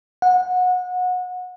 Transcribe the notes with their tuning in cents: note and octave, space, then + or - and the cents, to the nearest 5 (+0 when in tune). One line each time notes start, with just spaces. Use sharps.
F#5 -25